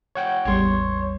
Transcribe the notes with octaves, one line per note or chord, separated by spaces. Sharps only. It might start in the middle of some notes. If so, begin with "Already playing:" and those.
C#5 F#5 G5
A1 E2 G3 C#5 C6 C#6